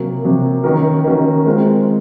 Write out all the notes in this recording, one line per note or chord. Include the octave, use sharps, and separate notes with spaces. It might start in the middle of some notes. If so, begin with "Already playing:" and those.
Already playing: C3 F#3 A#3
C3 F#3 A#3
D#3 A#3 C#4 F#4 A#4
D#3 A#3 C#4 F#4 A#4
G#3 C4 F4 A#4